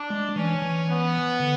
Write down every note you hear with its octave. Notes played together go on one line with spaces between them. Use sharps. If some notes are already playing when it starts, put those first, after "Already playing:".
Already playing: D4
G#3
E3 C#4
E3
B3
D3